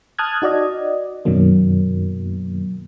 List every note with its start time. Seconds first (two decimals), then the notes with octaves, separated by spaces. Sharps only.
0.19 A5 D#6 F6 F#6 G#6
0.42 D#4 F#4 D5 D#5
1.25 F#2 B2 D#3 F#3 A#3